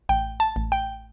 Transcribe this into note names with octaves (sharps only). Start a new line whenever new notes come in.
A1 G5
A5
A1
G5